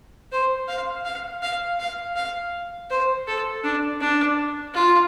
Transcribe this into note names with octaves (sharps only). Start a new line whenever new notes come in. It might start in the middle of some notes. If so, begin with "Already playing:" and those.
C5
F5
F5
F5
F5
F5
C5
A4
D4
D4
F4